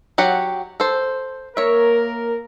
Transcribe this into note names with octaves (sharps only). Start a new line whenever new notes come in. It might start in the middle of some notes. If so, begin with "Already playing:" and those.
F#3 G4 F#5
A4 C5
A#3 A#4 C#5 E5